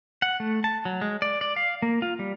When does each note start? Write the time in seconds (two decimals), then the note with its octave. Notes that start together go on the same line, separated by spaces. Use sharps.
0.22 F#5
0.40 A3
0.64 A5
0.85 F#3
1.01 G#3
1.22 D5
1.41 D5
1.56 F5
1.82 A#3
2.02 F4
2.19 G3